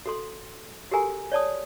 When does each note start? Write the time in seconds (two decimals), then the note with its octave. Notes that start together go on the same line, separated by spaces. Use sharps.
0.06 F#4 A4 C6
0.91 F#4 G4 A4 A#4 G#5 A#5
1.32 C#5 D5 A5 D#6